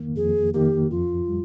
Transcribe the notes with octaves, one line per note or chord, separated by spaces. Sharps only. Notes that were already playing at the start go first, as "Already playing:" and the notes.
Already playing: F2 D#3 A#3
F2 G#4
D#3 A#3 G4
F2 F4
G3